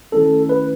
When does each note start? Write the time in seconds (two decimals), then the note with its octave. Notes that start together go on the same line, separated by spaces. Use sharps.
0.12 D#3 A3 C#4 E4 A4
0.49 B4